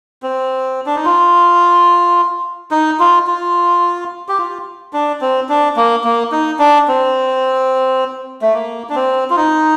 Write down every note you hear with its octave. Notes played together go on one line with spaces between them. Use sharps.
C4
D4
D#4
F4
D#4
F4
F4
G4
F4
D4
C4
D4
A#3
A#3
D#4
D4
C4
A3
A#3
D4
C4
F4
D#4